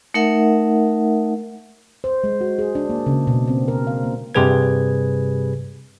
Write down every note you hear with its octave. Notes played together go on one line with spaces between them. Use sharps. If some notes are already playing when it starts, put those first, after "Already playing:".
A3 D#4 A#4 E5 F#5
C5
G#3
F#4
G#4
D4
A#3
C#3
B2
C4
A#4
F5
A#3
G2 C3 G3 G#4 B4 G#6